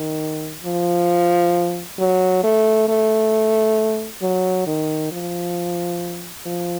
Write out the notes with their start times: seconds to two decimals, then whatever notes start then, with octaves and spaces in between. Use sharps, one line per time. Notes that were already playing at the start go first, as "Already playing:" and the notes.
Already playing: D#3
0.64 F3
1.99 F#3
2.44 A3
2.89 A3
4.22 F#3
4.67 D#3
5.11 F3
6.46 F3